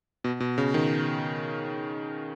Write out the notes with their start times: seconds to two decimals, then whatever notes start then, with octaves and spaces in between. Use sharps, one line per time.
0.24 B2
0.40 B2
0.58 C#3
0.74 D#3